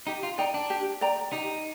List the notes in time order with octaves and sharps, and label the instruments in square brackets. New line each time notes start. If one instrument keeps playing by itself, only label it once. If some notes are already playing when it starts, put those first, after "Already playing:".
[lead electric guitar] D#4 [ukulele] G4
[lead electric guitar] F4
[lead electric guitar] D#4 [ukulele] D5 G5 A#5
[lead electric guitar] D4
[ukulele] G4
D5 G5 A#5
[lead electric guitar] D#4 [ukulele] G4